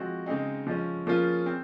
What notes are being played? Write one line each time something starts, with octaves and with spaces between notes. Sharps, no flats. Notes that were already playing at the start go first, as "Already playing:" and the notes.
Already playing: F3 G#3 C4 F#4
C#3 G#3 C4 D#4
F3 G#3 C#4
F3 A#3 C#4 F4 G#4
C4